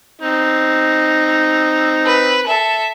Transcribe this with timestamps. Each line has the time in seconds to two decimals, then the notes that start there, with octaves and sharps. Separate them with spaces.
0.22 C4 D#4
2.06 B4
2.47 A4 E5